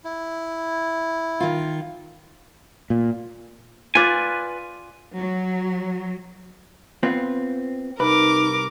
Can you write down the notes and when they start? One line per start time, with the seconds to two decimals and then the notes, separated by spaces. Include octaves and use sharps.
0.04 E4
1.40 D#3 F4
2.90 A#2
3.95 F4 B4 D5 G#5
5.18 F#3
7.03 B3 C4 F4
8.00 C2 D#4 A#4 B4 D6